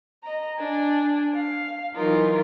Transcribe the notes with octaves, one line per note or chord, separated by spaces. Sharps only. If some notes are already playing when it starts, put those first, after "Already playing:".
D#5 A#5
D4 G#5
F5
E3 F#3 D#4 F4 A#4